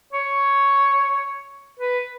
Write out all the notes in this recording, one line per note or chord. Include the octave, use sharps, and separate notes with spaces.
C#5
B4